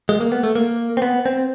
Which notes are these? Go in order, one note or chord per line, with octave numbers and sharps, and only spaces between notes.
G#3
A#3
B3
A3
A#3
C4
B3
C4